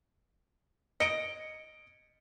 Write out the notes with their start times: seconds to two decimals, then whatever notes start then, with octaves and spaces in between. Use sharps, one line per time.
1.00 D#5 C#7 D7